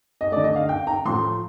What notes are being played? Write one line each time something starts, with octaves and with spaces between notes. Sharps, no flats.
D#5
D3 A3 D5
D#5
F5
G5
A#5
A2 F3 A3 C6